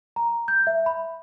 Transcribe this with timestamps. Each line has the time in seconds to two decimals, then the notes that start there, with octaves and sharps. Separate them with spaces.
0.16 A#5
0.48 G6
0.67 E5
0.86 B5